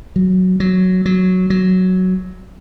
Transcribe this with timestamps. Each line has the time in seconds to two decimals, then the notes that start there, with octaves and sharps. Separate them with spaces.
0.16 F#3
0.60 F#3
1.06 F#3
1.50 F#3